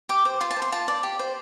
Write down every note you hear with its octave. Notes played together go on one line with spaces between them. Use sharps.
G4 D6
C5
F4 C6
A5
C5
C6
F4 A5
D5
G4
C5